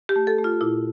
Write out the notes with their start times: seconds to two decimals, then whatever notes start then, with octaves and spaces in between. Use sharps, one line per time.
0.09 G4
0.16 A3
0.27 A4
0.38 A3
0.44 F4
0.61 A#2 E4